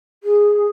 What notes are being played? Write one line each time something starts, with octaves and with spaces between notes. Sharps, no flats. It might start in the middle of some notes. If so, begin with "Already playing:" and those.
G#4